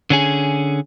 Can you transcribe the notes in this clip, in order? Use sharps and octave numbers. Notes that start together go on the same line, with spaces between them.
D3 C#4 G#4